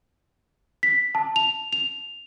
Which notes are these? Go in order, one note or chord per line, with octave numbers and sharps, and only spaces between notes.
B6
A5
F7
F7